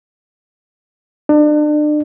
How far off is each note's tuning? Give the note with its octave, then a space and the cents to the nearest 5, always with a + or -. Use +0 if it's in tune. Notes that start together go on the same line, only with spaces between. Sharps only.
D4 +35